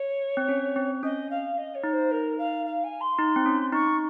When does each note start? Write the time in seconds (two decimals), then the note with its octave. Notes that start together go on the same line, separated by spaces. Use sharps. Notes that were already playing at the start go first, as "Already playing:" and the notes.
Already playing: C#5
0.37 C4
0.49 C#4
0.76 C4
1.03 C#4 D#5
1.30 F5
1.57 D#5
1.74 C#5
1.83 D#4
1.92 C5
2.11 A#4
2.38 F5
2.65 F5
2.83 G#5
3.00 C6
3.19 D#4
3.36 C4
3.46 C#4
3.72 D#4 C#6